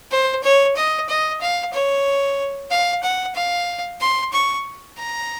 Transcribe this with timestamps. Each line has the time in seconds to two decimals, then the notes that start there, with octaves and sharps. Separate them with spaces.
0.11 C5
0.44 C#5
0.76 D#5
1.09 D#5
1.41 F5
1.73 C#5
2.71 F5
3.03 F#5
3.35 F5
4.01 C6
4.33 C#6
4.98 A#5